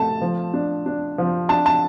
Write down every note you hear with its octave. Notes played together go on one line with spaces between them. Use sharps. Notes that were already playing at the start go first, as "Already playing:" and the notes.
Already playing: A3 A5
F3
D4
D4
F3
D4 A5
A5